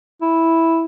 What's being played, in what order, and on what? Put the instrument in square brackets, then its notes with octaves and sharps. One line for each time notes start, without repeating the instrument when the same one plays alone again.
[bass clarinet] E4